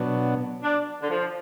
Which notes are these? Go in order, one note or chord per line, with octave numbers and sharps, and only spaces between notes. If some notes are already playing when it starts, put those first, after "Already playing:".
Already playing: B2 F#3 B3 D4
D4
D3
F3